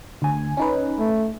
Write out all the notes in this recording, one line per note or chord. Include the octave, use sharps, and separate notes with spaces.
D2 G#5
C#4 D#4 B4
A3